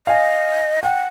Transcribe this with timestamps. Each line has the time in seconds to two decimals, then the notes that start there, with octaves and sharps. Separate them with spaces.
0.07 D#5 F5 G#5
0.83 F#5 G5